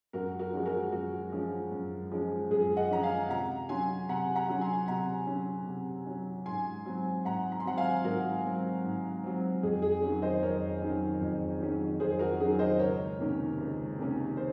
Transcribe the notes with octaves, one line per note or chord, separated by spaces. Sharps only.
F#2 F#4 A#4
F#4 A#4
F3 G#3 C#4
F#4 A#4
F#2 F#4
F3 G#3 C#4
F#2
F3 G#3 C#4
F#2 G#4
D#5 F#5
F3 G#3 C#4 A#5
F5 G#5
C3 F#5 A#5
F#3 C#4 G#5 C6
C3 F#5 A#5
F#5 A#5
F#3 C#4
G#5 C6
C3 F#5 A#5
F#3 C#4
C3
F#3 C#4
G#2 G#5 C6
F#3 C4
G#2 F#5 A#5
A#5
C6
F#3 C4 F#5 A#5
F5 G#5
G#2 F#4 A#4
F#3 C4
G#2
F#3 C4
F2 G#4
G#4
D#3 F#3 C#4
C5 D#5
F2 A#4 C#5
D#3 F#3 C#4
F2
D#3 F#3 C#4
F2 G#4 C5
F#4 A#4
D#3 F#3 C#4 G#4
C5 D#5
C#2 A#4 C#5
C3 D#3 A#3 C#4
C#2
C3 D#3 A#3 C#4
C5